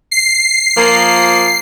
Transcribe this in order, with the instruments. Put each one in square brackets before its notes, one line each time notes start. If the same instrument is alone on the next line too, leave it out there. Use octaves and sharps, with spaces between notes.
[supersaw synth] C7
[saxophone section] F3 A#3